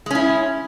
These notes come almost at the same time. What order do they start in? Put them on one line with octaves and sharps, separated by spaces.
G#3 C#4 E4